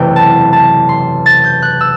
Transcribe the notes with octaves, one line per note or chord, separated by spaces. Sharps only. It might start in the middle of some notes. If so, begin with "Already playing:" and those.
Already playing: F#1 E2 C3 E3 A3 G5
A5
A5
C6
A6
G6
F#6
E6